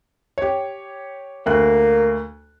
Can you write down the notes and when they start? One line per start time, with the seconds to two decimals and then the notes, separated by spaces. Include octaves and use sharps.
0.38 G4 C#5
1.46 D2 A#3 F#6